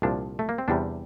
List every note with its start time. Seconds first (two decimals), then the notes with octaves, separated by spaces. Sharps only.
0.02 C2 A#2 F3 D4
0.39 A3
0.49 A#3
0.58 C4
0.68 E2 C3 G3 D4